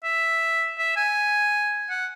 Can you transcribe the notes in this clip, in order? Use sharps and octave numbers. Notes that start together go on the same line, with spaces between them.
E5
E5
G#5
F#5